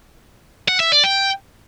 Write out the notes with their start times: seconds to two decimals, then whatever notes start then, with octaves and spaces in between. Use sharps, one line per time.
0.68 F#5
0.80 E5
0.92 D5
1.04 G5